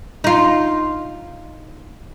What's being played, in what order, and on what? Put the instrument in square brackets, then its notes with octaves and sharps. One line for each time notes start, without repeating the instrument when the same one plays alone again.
[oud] D#4 F4